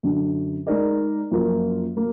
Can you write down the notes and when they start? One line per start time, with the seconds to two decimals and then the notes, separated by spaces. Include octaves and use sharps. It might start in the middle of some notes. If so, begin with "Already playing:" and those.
0.03 F#2 D3 F#3 D4
0.67 G#3 D#4 A#4 D5
1.31 F#2 F3 A#3 F4 A#4
1.96 F#3 A#3